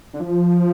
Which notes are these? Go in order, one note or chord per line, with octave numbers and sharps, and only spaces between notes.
D3
F3